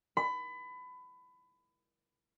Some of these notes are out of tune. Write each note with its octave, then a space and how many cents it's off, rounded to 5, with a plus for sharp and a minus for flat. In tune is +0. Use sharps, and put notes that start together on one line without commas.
B5 +25